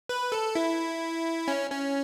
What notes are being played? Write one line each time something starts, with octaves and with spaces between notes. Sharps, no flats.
B4
A4
E4
C#4
C#4